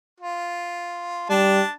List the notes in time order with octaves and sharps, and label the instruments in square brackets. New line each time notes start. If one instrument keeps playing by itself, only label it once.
[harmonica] F4
[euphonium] G3 [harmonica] D4 A5